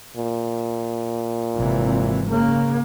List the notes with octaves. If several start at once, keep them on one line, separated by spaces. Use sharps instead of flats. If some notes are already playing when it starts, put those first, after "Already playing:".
A#2
G#1 C3 E3
C#3 A#3